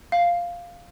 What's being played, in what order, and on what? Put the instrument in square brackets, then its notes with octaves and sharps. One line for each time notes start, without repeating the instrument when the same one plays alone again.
[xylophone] F5